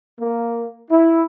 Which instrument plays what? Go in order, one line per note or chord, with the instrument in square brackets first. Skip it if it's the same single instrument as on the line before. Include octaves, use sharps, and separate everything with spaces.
[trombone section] A#3
E4